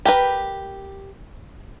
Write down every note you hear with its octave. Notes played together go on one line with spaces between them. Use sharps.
G4 A#4 B4